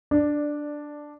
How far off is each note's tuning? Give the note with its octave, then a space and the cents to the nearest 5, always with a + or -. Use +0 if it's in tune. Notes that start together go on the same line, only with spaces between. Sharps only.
D4 +0 D5 +10